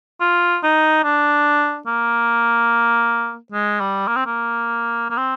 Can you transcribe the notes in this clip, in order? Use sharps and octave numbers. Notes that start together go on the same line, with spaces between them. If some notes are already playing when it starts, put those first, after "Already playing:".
F4
D#4
D4
A#3
G#3
G3
A#3
C4
A#3
A#3
C4